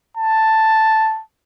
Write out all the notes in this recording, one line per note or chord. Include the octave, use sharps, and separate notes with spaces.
A5